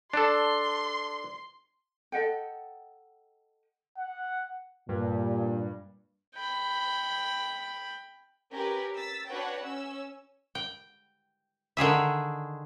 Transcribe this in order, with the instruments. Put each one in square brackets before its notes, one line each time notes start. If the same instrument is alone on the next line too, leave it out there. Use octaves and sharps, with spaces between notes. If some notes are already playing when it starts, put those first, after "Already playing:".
[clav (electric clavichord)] D4 A4 [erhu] C6
[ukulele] A4 D#5 F#5 G5
[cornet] F#5
[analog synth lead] G2 [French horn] A#2
[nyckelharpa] G5 B5
[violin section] C#4 G4 A#4 B4 C#5
E6 A6 B6
D4 F#4 B4 C#5 F#5 G5
C#4 E6
[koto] G5
D3 D#3 G#4 E5